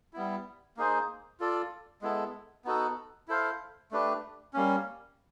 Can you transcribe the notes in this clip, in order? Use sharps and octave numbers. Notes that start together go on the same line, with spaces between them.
G3 B3 E4
A#3 D#4 G#4 C5
F4 A4 D5
G#3 B3 E4 A4
B3 D#4 F#4 A4
E4 A4 C5 F5
A3 D4 G4 B4
G3 A#3 C#4